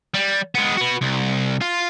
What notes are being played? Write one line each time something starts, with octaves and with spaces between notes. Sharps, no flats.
G3
G#3 B3
F#4 B4
C2
F4